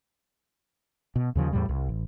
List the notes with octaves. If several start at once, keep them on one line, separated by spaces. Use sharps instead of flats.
B2
D#2 C#3 F3
E2 A2 G3
C2
A1